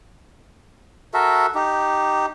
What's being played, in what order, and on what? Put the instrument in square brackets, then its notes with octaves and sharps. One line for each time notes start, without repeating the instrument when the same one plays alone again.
[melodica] F#4 A4 A#4 E5
D#4 G4